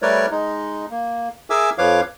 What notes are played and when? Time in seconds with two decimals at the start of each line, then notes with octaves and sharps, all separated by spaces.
0.02 G3 A3 A#4 B4 C#5 D5
0.31 G#3 D#4
0.90 A#3
1.50 G#4 A#4 E5 G#5 D6 E6
1.78 F2 F3 B4 C#5 F5 D6